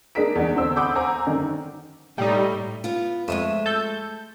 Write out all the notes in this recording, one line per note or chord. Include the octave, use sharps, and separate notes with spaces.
G#3 D4 G#4 A#4 B6 D7
E2 D4
E2 D3 C5 E6
F#5 B5 C6 D6 D#6 G6
C5 F#5 G#5 A#5 D6
F#2 D3 D#3 D4
A2 G3 D#4
B3 F4
F2 G#3 A3 E5 D#7
A4 G6